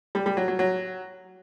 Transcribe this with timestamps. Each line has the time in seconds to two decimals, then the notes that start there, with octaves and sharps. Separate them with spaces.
0.15 G3
0.26 G3
0.37 F#3
0.48 F#3
0.59 F#3